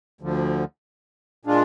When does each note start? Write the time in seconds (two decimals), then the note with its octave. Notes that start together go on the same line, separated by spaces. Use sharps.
0.21 D2 D3 F3
1.45 A#2 G#3 D4 F4